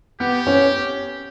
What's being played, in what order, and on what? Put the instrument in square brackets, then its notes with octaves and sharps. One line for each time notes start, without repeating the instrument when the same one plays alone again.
[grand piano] B3 [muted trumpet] G4
[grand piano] C#4